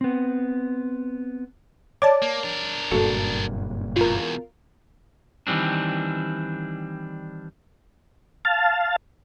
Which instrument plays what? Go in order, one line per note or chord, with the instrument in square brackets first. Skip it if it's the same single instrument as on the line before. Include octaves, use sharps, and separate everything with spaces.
[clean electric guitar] B3 C4
[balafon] C#5 D5 [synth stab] A5 D6
[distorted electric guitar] A#3
D4 A#4
[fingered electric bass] F#1 G2 A#2 [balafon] F#4 [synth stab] A4
[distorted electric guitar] E2 B2 [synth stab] F4 A#4
[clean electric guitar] D#3 E3 G3 C4 D4
[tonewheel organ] F5 A5